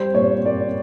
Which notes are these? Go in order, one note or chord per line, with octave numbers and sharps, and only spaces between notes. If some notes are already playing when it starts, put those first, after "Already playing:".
Already playing: G3 C5
A#2 C#5
A#3 D5